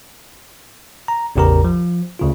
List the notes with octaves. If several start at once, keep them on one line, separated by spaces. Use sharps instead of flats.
A#5
A1 E2 C#3 G4 A#4 A#5
F3
D2 C#3 F4